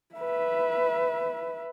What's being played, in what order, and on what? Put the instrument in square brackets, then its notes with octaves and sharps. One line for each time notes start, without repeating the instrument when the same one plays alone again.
[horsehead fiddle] B4 E5